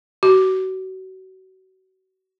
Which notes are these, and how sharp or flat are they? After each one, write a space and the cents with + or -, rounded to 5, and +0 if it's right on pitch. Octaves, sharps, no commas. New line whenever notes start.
F#4 +30